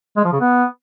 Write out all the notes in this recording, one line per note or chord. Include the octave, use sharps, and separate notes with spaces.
G#3
F3
C#3
B3